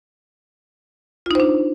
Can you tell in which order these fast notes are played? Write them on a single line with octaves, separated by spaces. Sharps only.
F4 D#4 C5 D4